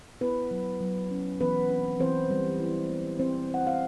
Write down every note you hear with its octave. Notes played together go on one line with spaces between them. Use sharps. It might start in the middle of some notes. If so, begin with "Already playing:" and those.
B3 E4 B4
F#3
F#3
C#4
E3 B3 B4
C4
E3 C4 C5
G3
E4
B3
B3 C4 C5
G#3 F#5
F5